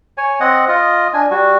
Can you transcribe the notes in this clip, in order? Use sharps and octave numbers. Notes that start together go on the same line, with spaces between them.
C#5 G#5
C4 D#5 F#5
F4 D#5
D4 G#5
G3 F#4